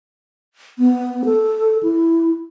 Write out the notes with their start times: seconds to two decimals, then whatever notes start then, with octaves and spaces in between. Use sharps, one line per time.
0.79 B3
1.25 A4
1.83 E4